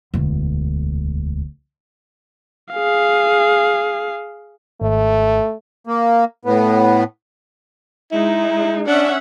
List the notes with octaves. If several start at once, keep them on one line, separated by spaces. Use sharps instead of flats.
E1 D2
G#4 F5
G#1 A3
A#3
A2 B3
G#3 D#4 E4
C#4 D4 E5 F#5